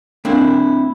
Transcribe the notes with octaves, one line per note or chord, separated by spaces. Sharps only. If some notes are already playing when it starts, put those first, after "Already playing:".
A#3 C4 D4 E4